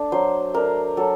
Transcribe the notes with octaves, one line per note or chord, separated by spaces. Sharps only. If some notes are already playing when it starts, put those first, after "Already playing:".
Already playing: A3 D4
F#3 C5
A3 D4 A#4
F#3 A4